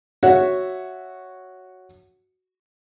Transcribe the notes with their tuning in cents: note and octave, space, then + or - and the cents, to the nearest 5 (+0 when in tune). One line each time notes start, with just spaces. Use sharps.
F#4 +0 C#5 +0 E5 +0